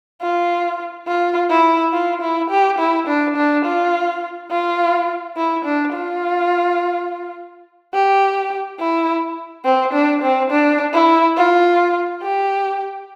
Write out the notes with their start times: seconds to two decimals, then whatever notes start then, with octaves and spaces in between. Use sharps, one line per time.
0.22 F4
1.08 F4
1.50 E4
1.94 F4
2.22 E4
2.50 G4
2.79 E4
3.07 D4
3.37 D4
3.65 F4
4.51 F4
5.37 E4
5.65 D4
5.94 F4
7.94 G4
8.80 E4
9.65 C4
9.93 D4
10.22 C4
10.51 D4
10.93 E4
11.37 F4
12.22 G4